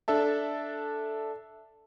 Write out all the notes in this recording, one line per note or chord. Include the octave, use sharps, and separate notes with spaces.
D4 A4 E5 A5